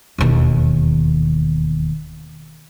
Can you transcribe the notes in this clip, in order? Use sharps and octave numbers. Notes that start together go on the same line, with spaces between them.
E1 D#2